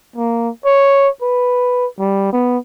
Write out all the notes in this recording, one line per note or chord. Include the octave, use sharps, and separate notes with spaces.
A#3
C#5
B4
G3
B3